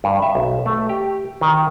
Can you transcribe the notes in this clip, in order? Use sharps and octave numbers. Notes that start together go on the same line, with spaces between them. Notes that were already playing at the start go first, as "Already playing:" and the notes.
G2
E5
B1
A3
G4
D#3